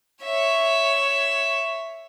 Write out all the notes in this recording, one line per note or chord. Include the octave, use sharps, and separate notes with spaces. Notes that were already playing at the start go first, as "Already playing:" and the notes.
C#5 E5